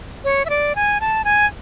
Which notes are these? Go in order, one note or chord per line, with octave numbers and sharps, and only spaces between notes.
C#5
E5
D5
G#5
A5
G#5